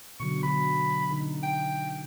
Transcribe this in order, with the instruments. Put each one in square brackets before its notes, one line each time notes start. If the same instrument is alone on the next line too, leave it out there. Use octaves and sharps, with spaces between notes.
[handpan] B2 D3 F#3 [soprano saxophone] C#6
[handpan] D3 F#3 [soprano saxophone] B5
[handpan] D3 D#4
[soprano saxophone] G5